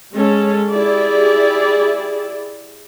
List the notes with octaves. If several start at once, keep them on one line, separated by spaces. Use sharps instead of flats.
G#3 C#4 A4
E4 G4 G#4 D5